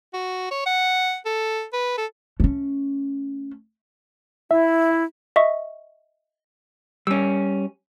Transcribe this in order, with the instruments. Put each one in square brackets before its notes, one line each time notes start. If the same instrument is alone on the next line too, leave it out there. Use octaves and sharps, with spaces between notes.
[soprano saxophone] F#4
C#5
F#5
A4
B4
A4
[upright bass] A3 C#4
[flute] E4 [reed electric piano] E5
[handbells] D#5 E5 C#6
[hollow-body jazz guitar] G3 C#4 [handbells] E6